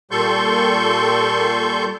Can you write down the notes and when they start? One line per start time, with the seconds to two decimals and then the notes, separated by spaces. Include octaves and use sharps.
0.11 A#2 G3 A4 C6 C#6 G6